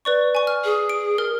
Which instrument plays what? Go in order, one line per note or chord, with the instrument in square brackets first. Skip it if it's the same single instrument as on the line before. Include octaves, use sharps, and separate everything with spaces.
[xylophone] B4 D5 C#6
G#5 C#6
F6
[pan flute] G#4
[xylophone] D7
A#4 F6